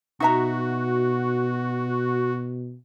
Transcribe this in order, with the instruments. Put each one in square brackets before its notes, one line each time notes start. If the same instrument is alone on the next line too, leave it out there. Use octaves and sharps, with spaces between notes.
[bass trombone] B2 [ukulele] D#4 E5 A#5 [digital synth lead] F#4